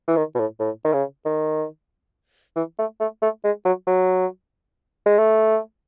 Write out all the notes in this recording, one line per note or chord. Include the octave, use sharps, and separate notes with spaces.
E3
D#3
B2
A2
A2
D#3
C#3
D#3
E3
A3
A3
A3
G#3
F#3
F#3
G#3
A3